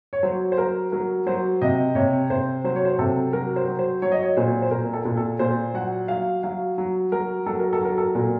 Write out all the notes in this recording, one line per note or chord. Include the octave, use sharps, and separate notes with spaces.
C#5
F#3 C5
C5
F#3 A#4
F#3 A#4
F#3 C5
C3 D#5
C3 C#5
C3 C5
F#3 C5
C#5
C5
C3 A4
F#3 A#4
C5
F#3
C5
F#3 C#5
D#5
C#5
A#2 C5
C5
A#2 A#4
A#4
A4
A#2
A4
A#2 C5
F#3 F#5
F#3 F5
F#3 F5
F#3
F#3 A#4
F#3 A4
A#4
A4
F#3 A#4
A4
A#2 A#4